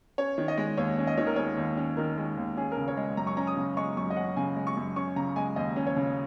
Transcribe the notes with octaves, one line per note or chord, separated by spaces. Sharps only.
C#4 C#5
D#3
D#5
G#3
D#2 C#5
C#4
D#5
D#3 C#5
A#4
G#3 C#5
D#2
C#4
D#3 A#4
G#3
D#2
C#4 G#4
A#4
C#3
C#5
G#3
F#2 A#5
C#6
C#4 A#5
D#6
C#3
G#3 C#6
F#2 C#6
D#5
C#4 F#5
C#3 G#5
G#3
C#6
F#2
C#4 C#6
C#3 A#5
G#3 G#5
D#2 D#5
C#4
C#5
C#3